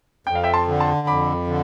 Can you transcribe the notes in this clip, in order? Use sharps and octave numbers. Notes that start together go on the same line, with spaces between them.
F2 G5
F5
E5 G5
A5 C6
D3
A5 C6
F2 B5 D6
D3